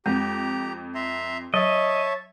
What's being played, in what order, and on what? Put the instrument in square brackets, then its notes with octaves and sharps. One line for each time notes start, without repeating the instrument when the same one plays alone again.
[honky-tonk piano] F2 [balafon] G#3 [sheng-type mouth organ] G4 A#5
[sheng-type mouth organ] E5 A#5 C6
[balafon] F#3 [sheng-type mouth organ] C#5 E5 A5 [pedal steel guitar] D#5